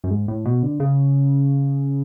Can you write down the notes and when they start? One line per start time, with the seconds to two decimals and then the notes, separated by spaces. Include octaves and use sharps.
0.04 F#2
0.10 G#2
0.28 A2
0.45 B2
0.63 D3
0.80 C#3